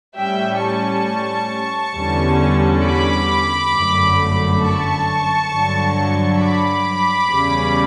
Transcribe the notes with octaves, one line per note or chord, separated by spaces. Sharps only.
A2 G3 C#4 E5 G5
A5 C#6
E2 D3 G3 C#4
B5 D6
G1 F#2 D3 A3
A5 C#6
G2 D3 F#3
B5 D6
E2 C#3 G3 C#4